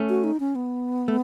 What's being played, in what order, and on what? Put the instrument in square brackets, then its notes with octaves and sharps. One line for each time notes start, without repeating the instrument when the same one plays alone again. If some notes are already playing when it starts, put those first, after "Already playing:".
Already playing: [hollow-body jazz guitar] A3 C#4
[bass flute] F#4
D#4
C#4
B3
[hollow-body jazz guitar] A3